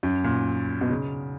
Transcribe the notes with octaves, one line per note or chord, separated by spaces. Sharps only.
F#2
A#2
B2
C#3